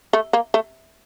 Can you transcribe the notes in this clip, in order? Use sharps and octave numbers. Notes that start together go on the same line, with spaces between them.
A3
A#3
A3